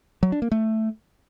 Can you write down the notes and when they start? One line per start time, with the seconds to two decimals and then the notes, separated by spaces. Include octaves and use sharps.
0.23 F#3
0.32 D4
0.42 A#3
0.52 A3